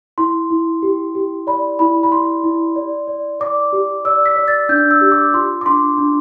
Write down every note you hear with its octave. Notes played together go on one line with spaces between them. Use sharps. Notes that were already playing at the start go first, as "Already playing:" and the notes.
E4 C6
E4
G4
G4
D5 B5
E4 B5
B5
E4 C6
E4
D5
D5
D5 D6
G4
D5 E6
B6
D5
A6
D4 G6
E6
G4
D6
F4 C6
D6
D4 C6
D4